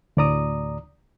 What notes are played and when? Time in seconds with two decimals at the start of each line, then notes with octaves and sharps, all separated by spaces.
0.17 D2 A2 D5 A#5 D#6